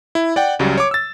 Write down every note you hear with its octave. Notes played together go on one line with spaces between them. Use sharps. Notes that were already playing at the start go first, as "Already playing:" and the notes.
E4
D5 F#5 G5
C#2 C#3 F#3 G3
C#5 D6
E6 A6